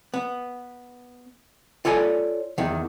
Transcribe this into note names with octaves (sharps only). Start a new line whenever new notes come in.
B3
F4 A4 C#5 D5 G#5
E2 D#3